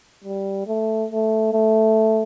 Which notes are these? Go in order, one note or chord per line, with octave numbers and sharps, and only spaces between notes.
G3
A3
A3
A3